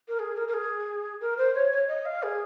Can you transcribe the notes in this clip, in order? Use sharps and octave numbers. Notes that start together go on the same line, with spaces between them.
A#4
G#4
A#4
A#4
G#4
A#4
C5
C#5
C#5
D#5
F5
G#4